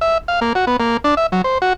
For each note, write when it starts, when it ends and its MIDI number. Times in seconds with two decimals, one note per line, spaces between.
0.01 0.18 76
0.28 0.40 77
0.41 0.53 58
0.55 0.65 66
0.67 0.77 59
0.80 0.97 58
1.04 1.15 62
1.17 1.27 76
1.32 1.42 54
1.44 1.58 72
1.62 1.73 66